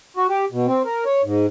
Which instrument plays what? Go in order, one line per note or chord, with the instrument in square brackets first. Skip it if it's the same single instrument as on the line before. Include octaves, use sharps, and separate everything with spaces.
[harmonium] F#4
G4
B2
C4
A#4
C#5
G#2